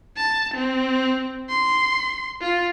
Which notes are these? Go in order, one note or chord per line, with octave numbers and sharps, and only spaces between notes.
A5
C4
C6
F4